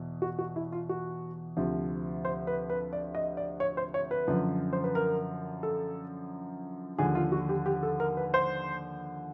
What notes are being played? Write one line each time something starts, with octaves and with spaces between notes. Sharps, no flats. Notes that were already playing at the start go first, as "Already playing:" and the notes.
Already playing: E2 B2
F#4
F#4
E4
F4
F#4
D2 C3 F3
C5
B4
B4
D5
D#5
D5
C#5
C5
C#5
B4
F#2 D3 F3
C5
B4
A#4
A4
D#2 D3 F3 G#4
F4
F#4
G4
G4
A4
A#4
B4
C5